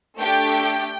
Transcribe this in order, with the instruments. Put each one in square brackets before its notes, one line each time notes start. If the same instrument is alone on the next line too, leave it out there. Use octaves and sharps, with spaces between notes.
[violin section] A3 D4 G4 G5